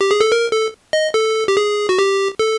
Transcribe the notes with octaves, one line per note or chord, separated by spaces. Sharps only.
G4
G#4
A4
A#4
A4
D#5
A4
G4
G#4
F#4
G4
A4